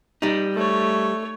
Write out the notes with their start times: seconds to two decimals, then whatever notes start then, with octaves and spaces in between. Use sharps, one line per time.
0.22 G3 D#4
0.54 A3 C#5